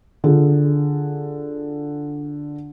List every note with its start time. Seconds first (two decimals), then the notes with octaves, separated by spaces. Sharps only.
0.24 D3 F4 G#4